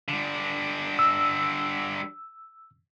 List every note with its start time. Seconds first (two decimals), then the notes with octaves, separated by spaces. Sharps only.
0.09 D3 G3
0.99 E6